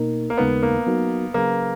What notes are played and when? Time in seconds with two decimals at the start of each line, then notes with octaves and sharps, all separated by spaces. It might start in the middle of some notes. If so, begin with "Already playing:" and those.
Already playing: B2 A#3 D#4 A#4
0.30 A#3
0.38 D#2 C#3 G#3 B3 D#4 A#4
0.63 A#3
0.87 F#3 B3 D#4 F#4 A#4
1.34 C#3 F#3 A#3 C#4 G#4 B4